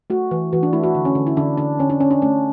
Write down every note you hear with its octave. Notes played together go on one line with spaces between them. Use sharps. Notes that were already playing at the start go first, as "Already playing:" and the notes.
A3 F#4
E3
E3 F#4
D4
A3 E4
F#4
D3
C#4
D3
E4
D3 D4
D3 D4
D3 C#4
D4
C#4
D4
A3 C#4